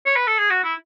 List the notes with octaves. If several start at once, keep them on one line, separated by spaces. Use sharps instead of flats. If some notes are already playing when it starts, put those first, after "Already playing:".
C#5
B4
A4
G#4
F#4
E4